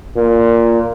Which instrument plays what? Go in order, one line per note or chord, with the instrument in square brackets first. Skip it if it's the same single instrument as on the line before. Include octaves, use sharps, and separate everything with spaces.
[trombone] A#2